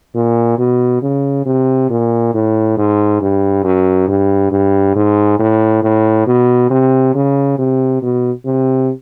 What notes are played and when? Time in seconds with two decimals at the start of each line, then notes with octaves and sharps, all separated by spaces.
0.15 A#2
0.58 B2
1.02 C#3
1.46 C3
1.90 A#2
2.34 A2
2.77 G#2
3.21 G2
3.64 F#2
4.08 G2
4.52 G2
4.96 G#2
5.39 A2
5.83 A2
6.27 B2
6.70 C3
7.15 C#3
7.58 C3
8.02 B2
8.45 C3